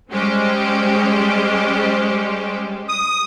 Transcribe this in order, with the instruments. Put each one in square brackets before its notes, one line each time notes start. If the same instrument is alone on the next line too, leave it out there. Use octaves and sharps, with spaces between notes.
[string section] G3 G#3 C#4 G4 C5
[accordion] D#6